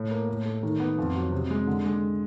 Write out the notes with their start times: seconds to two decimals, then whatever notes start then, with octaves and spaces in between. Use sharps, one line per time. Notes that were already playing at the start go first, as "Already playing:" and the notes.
Already playing: A2
0.11 A#3
0.29 A2
0.45 A3
0.63 D#3
0.80 B3
0.98 F2
1.16 F#3
1.32 C3
1.50 G#3
1.67 D3
1.85 G#3